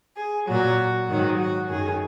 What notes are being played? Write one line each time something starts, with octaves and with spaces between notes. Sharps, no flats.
G#4
A#2 F#3 F#4
G#2 D#3 F#3 F#4
F#4
F#2 D#3 F#3 G#4